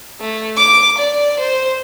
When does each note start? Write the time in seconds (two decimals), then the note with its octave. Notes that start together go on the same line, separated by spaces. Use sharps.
0.21 A3
0.58 D6
0.99 D5
1.40 C5